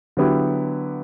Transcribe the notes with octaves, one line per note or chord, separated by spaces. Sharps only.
D3 F#3 B3 E4 G4